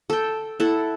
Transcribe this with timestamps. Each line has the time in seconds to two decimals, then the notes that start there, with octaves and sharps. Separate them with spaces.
0.10 A4 G5
0.60 E4 A4 F#5